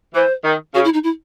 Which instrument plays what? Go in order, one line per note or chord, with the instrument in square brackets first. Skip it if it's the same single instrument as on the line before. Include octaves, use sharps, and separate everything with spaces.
[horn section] E3 [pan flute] C5
[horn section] D#3
[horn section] C#3 [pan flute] F#4
[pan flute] E4
D#4
E4